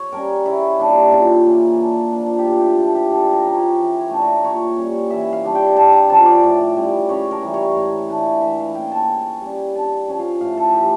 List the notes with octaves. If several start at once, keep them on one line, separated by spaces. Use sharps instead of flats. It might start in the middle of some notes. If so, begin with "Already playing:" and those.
Already playing: C#5
G3 C#4 A#4
C#3 E4
G3 A#3 D4
C#3 F4
E3 A#3 C#4
D3
F3 A#3 D4
G4
A2 F4
G4
F3 A3 F4
G4
D3 A4
A#4
F3 C#4
C#5
E3
C#5
A3 D4
A#4
A#2 C#5
G3 C#4
E3 E5
F5
G3 D4
G5
D3 A5
A#5
F3 C#4 A5
D5
A2
G3 C#4
C#3 C#5
A#4
E3 G3
C#5
A2
E3 A3 D4
E3 E5
F5
A#3 C#4 G5
A5
C#3
G3 C#4
D3 A5
F3 C#4
F5
A2 F5
A4
E3 A3 G4